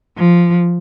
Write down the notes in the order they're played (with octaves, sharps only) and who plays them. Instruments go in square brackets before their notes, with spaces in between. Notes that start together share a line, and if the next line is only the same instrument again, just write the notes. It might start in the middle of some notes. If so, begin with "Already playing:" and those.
[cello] F3